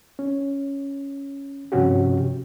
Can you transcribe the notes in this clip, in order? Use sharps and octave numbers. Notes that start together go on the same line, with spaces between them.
C#4
G2 C3 F3 C#4 F#4 G4